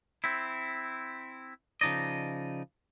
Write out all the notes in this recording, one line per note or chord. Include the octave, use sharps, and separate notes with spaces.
C4 E4
C#3 F3 D#4 D5 D#5